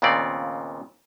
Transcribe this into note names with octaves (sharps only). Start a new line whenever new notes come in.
D#2 A#2 C#3 B3 C4 D5